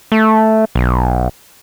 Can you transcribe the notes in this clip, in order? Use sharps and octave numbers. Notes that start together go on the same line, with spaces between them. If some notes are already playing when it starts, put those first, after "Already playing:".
A3
B1